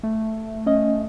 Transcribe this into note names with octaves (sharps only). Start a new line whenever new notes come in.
A3
C#4 D#5